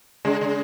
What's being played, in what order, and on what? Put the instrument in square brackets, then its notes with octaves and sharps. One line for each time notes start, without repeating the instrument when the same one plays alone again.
[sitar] C#3 [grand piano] G#3
[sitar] C#3